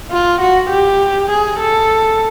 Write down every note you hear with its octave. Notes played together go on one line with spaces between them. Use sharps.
F4
F#4
G4
G#4
A4